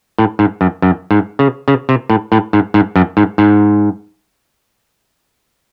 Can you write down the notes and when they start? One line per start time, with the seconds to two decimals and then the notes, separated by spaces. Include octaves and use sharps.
0.18 A2
0.39 G#2
0.61 F#2
0.82 F#2
1.11 G#2
1.39 C#3
1.68 C#3
1.89 C3
2.10 A2
2.32 A2
2.53 G#2
2.74 G#2
2.96 F#2
3.17 G#2
3.38 G#2